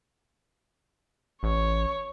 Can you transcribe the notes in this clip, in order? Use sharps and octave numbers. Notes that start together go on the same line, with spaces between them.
A1 C#5